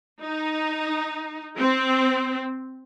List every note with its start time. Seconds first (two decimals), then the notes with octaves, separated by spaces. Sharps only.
0.22 D#4
1.58 C4